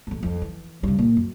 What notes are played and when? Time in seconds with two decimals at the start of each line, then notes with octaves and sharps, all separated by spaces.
0.07 A1 G#2
0.23 F2 F3
0.42 E3
0.83 G2 C3
0.99 A#2
1.17 F#2